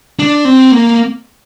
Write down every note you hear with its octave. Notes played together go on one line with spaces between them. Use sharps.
D4
C4
A#3